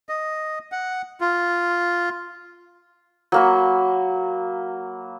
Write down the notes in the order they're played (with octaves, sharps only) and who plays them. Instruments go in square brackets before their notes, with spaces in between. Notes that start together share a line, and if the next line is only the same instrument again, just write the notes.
[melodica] D#5
F#5
F4
[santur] F#3 A#3 B5